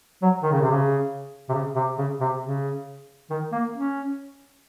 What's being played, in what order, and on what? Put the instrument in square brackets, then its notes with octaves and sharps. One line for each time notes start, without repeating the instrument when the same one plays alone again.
[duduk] F#3
D#3
C#3
C3
C#3
C3
C#3
C3
C#3
C3
C#3
D#3
A#3
C#4